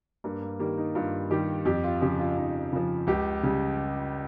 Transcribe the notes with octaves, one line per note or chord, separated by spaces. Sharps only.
G2 A#3
A#3
D#3 G3 A#3
D#4
G2 F4
D#3 G3 G4
F2 G4
F4
C#3 F3 G4
F4
F4
F2 D#4
C#3 F3 F4
C#2 G4
C#3 G3